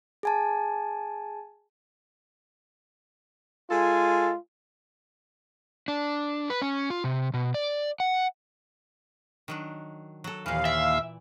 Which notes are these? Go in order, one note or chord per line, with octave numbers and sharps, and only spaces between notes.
G#4 G#5 A5
G#3 F4 A4 G#5
D4
B4
C#4
F4
C3
B2
D5
F#5
D#3 F#3 D4
F#3 A4
D#2 A#2 E3 F5
D5 E5